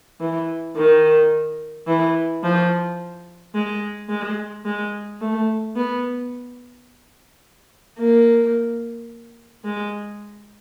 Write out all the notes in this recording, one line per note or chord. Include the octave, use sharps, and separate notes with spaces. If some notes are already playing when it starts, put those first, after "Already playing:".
E3
D#3
E3
F3
G#3
G#3
G#3
A3
B3
A#3
G#3